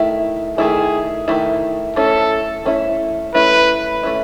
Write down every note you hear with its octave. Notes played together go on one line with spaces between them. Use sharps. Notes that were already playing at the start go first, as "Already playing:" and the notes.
Already playing: D#3 A3 E4
D#3 A3 E4 G#4
D#3 A3 E4
A3 C#4 E4 A4
A3 C#4 E4
A3 C#4 E4 B4
A3 C#4 E4